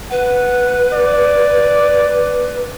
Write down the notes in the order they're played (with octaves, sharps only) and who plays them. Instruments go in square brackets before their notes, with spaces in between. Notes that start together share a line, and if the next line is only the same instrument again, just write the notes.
[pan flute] B4 [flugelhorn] F#5
[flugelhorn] D5